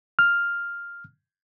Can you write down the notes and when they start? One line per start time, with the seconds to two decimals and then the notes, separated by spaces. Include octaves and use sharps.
0.19 F6